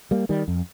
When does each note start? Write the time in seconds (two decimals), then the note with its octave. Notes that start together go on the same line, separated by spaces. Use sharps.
0.11 G3 A#3
0.29 D#3 G3
0.48 F2